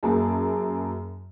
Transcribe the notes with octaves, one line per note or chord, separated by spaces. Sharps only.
F#2 A#3 G#4 A5